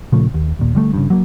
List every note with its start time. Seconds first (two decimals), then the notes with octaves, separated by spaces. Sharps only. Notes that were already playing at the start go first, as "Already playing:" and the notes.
0.12 A#2 C#3 F3 A3
0.34 D#2
0.59 D#2 A#2
0.75 D3 G3 A3
0.94 G2 C#3
1.10 F#3 A#3